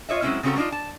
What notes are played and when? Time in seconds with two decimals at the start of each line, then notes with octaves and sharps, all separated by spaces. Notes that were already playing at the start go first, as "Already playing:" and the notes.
0.09 F4 C#5 D#5 E5
0.22 F#3 G#3 A3 C4 C#4 E4
0.43 C#3 C4 C#4 F#4 A4 A#5
0.56 A3 A#3 D4 D#4 F4
0.72 A5